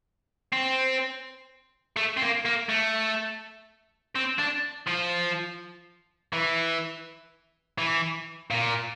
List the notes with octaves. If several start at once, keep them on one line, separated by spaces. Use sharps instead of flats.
C4
A3
C4
A#3
A#3
A3
C4
D4
F3
E3
E3
A#2